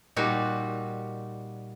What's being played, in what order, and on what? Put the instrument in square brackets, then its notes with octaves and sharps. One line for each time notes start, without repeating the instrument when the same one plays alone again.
[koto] A#2 G3 D#4 F#4